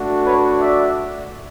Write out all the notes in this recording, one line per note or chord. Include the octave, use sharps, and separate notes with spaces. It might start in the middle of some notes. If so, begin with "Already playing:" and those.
Already playing: A3 D4 F#4
B4 C#5
D5 E5